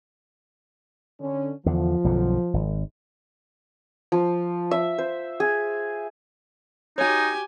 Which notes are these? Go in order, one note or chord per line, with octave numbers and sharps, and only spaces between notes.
D3 C#4
E2 D3 F3
B1 F#2 D3
G#1
F3
E5
C5
G#4
D#4 F#4 G4 C#5 G#5